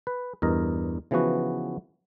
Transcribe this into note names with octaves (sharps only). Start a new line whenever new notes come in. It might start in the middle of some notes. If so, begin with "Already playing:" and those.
B4
E2 G2 A#4 D#5
C#3 E3 F3 B3 F#4